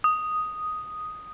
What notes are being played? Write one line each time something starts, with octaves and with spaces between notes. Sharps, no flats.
D#6